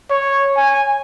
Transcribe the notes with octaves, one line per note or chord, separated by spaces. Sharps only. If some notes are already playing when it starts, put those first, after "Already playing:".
C#5
G#5